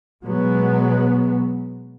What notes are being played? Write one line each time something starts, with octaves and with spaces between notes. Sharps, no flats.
B2 F#3 G#3 B3